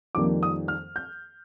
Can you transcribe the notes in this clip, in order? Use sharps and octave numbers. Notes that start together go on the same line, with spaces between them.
F2 D#3 G3 A#3 D6
D#6
F6
G6